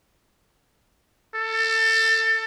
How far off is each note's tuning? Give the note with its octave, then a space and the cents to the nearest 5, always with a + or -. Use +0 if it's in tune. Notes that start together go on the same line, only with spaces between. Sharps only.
A4 +25